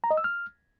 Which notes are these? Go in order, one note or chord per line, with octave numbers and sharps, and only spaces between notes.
A#5
D#5
E6
F6